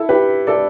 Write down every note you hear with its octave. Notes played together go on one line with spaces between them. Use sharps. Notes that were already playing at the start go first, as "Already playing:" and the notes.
Already playing: E4 A4
G4 B4
A4 D5